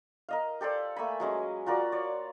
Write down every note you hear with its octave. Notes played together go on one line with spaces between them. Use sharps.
A#4 D#5 F5
G4 A4 C5 D5
A3 A#3 G#5 B5
F#3 G#3 C#4
F4 F#4 A#4 D5
C#5 D5